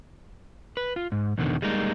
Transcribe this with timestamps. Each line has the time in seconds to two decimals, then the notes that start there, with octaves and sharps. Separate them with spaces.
0.77 B4
0.96 F4
1.12 G#2
1.38 E2 B2 D3 D#3
1.62 G3 G#3 A#3 D#4